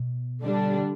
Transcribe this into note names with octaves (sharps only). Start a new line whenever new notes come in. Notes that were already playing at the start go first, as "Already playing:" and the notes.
Already playing: B2
D3 G3 D4